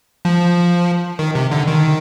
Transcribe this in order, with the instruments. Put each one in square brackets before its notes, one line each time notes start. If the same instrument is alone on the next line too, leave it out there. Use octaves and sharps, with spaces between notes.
[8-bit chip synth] F3
D#3
C3
D3
D#3